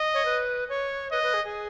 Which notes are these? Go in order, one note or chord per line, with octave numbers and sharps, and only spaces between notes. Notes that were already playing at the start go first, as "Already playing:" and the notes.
Already playing: D#5
C#5
B4
C#5
B4 D#5
B4
G#4
G#4